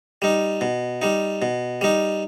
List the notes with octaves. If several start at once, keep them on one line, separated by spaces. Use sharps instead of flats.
G3 D#4
B2
G3 D#4
B2
G3 D#4